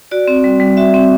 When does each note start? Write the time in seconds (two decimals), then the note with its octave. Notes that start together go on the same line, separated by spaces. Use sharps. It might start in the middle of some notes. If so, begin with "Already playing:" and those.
0.11 F#4 D5
0.28 C4
0.44 G3
0.60 G3
0.77 F#4 E5
0.94 C4